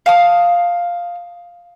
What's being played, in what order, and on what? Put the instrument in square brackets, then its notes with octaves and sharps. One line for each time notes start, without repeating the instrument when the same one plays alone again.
[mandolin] F5 A5 D#6